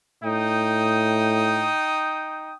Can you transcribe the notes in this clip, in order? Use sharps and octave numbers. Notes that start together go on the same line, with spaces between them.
A2 D#4 G5 D#6